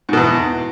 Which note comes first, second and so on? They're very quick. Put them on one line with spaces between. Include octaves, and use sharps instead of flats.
G#2 B2 E2